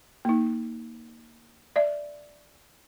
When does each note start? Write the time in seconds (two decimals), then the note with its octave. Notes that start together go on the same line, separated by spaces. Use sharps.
0.25 A#3 D#4
1.76 D5 E5